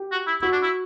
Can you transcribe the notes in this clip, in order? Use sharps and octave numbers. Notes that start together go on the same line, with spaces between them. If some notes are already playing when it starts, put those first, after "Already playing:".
Already playing: G4
F#4
E4
E4 F#4
D4
E4